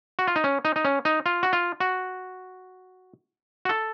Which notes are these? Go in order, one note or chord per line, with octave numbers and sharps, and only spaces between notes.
F#4
F4
D#4
C#4
D#4
D#4
C#4
D#4
F4
F#4
F4
F#4
F#4
A4